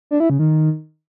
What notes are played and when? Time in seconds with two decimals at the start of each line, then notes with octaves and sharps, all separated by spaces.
0.11 D4
0.20 E4
0.30 C#3
0.39 D#3